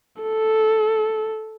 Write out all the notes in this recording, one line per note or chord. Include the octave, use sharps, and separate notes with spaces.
A4